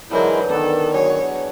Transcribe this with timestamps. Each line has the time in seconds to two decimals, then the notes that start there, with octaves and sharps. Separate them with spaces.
0.11 D3 E3 F#3 G#3 D#4 E4 A#4
0.49 D#3 B3 D4 A4
0.94 F#3 G#4 C#5